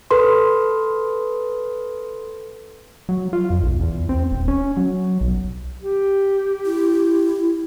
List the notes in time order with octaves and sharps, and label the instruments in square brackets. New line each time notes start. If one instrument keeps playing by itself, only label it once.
[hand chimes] A4 B4 C6
[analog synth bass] F#3
F4
F2
B1
E2
C4
D#1
C#4
F#3
B1
[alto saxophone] G4
[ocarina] E4